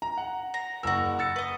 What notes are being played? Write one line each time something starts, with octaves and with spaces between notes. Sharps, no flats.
A#5
F#5
A#5
F#1 F#4 A#4 E6
E6 A6 C#7
B4 D#5